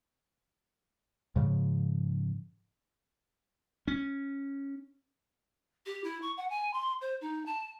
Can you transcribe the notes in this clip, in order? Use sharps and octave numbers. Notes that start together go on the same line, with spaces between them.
G#2 C#3 F3
C#4
G4
E4
C#6
F#5
G#5
C6
C5
D#4
A5